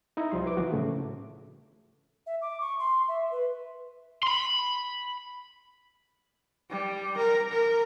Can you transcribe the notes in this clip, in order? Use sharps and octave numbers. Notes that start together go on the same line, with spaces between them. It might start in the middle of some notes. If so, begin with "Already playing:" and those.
D#4 E4 A#5
C2 F3 G3 C6
E4 B4 D6
E3 F3 F#4
A2 C#3 A3
E5
D6
C#6
C6
E5
B4
B5 C6
G3
A#4
A#4